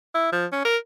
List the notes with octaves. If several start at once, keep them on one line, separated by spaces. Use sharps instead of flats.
E4
F3
C#4
A#4